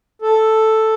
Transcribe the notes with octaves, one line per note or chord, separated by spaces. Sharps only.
A4